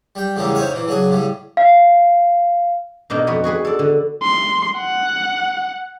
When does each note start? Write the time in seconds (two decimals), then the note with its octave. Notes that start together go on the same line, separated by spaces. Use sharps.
0.15 G3 G5
0.36 E2 A2 C#3 G3 G#3 A#3
0.55 D#4 C5 C#5 E5 F5
0.72 A#2 E3
0.87 C#3 F#3 D4 G#4
1.10 A2 C#3 G3
1.57 F5
3.10 B2 A#3 D4 D#4
3.27 F2 B3 F#4 B4
3.44 F#4 G#4 B4 G#5
3.65 A4 D5
3.79 D3
4.22 C6
4.77 F#5